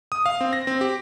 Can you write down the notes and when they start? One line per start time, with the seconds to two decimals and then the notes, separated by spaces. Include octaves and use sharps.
0.12 D#6
0.26 F5
0.41 C4
0.53 A#6
0.67 C4
0.81 G4